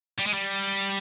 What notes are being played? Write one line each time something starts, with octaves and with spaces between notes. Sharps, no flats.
G3
G#3
G3